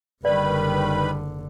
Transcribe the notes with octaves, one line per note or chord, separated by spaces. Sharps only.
F#1 D3 D#3 G3 B4 D5 B5